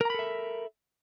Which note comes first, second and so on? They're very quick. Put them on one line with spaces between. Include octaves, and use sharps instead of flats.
A#4 A#5 B5 A4 E5